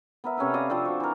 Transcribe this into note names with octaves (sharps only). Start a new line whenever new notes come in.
B3 A#4 E5
C3 C#4 A4 B4
D5 D#5 F5
F3 C4 D4
F#4
E3 A#4